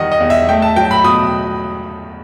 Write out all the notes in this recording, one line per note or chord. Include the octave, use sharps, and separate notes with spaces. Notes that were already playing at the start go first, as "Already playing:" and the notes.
Already playing: E2 D#3 G3 D#5 F#5
D#5
E2
E5
A3 G5
A5
F#3 G5
B5
B2 D#6